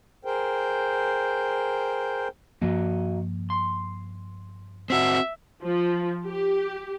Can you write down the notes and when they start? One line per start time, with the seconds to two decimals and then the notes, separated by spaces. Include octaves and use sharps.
0.25 G#4 A#4 C5 G5
2.62 G2 D#3 F3 A#3 F#4 D#5
3.50 C6
4.90 C4 F#4 E5
5.63 F3
6.24 G4